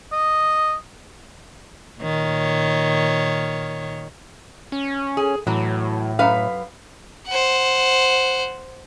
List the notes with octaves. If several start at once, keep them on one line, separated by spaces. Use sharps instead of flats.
D#5
A#2 D#3 C#5
C#4
G#4
A2 E3 F#3
F#2 B4 F5
C5 F#5